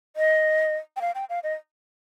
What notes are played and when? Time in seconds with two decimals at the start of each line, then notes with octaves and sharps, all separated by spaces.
0.16 D#5
0.96 G5
1.01 F5
1.15 G5
1.30 F5
1.43 D#5